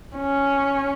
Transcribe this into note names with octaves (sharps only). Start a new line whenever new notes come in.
C#4